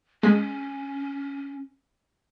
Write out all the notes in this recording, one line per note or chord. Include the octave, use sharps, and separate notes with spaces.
G#3 C#4 B6